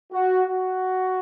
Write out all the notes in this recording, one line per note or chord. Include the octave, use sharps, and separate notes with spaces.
F#4
F#4